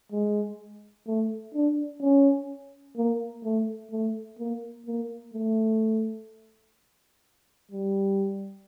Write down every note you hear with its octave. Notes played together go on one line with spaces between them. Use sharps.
G#3
A3
D4
C#4
A#3
A3
A3
A#3
A#3
A3
G3